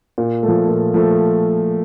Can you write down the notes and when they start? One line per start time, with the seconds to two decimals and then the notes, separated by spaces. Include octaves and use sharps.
0.18 A#2
0.43 A3
0.48 F3
0.68 A#2
0.94 F3 A3